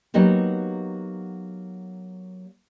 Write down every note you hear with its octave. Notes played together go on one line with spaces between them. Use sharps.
F#3 A#3 B3 D#4 F#4 G4